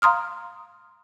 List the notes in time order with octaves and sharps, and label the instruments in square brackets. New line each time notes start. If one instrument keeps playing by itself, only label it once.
[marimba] F5 A#5 C6 D#6 F6